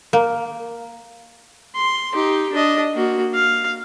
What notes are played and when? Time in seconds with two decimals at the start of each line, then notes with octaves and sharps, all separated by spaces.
0.13 A#3
1.76 C6
2.14 D#4 G4
2.53 D4 D#5
2.94 A#3 F#4
3.34 F5